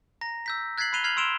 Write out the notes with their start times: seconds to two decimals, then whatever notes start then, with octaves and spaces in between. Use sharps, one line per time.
0.21 A#5 A#6
0.46 E6 G6 B6
0.78 F#6 G#6 A6 B6 C7 F#7
0.93 B5 F#6 C7 D#7 F7 G7
1.04 F6 G#6 C7 F7 F#7
1.17 C6 E6 D7 E7 F7 G7